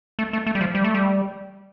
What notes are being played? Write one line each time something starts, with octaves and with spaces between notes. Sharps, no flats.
A3
A3
A3
G3
F3
G3
A3
G3